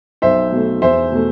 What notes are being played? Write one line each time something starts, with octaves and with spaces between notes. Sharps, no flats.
B1 C5 E5
B2 A3
E2 C5 E5
B2 A3